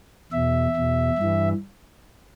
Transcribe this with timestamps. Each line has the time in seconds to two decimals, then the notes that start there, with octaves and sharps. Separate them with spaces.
0.32 E2 B2 E5
0.76 E2 B2
1.19 G2 E3